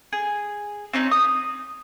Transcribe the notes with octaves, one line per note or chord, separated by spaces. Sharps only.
G#4
C4 C#4 D#4
D#6